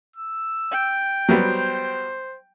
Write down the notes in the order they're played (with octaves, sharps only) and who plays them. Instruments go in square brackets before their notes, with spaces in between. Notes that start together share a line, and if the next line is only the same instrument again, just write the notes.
[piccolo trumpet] E6
[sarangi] G5
[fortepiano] F#3 G3 B3 [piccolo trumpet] C5